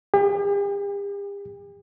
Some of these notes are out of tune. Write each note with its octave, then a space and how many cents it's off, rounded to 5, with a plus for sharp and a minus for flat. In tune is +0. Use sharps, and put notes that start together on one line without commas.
G4 +45